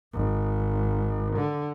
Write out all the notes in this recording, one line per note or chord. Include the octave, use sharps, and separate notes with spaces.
G#1
D3